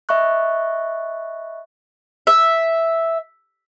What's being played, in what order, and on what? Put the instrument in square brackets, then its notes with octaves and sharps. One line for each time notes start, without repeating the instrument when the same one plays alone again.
[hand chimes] D#5 E5 B5 C#6 F#6
[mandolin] E5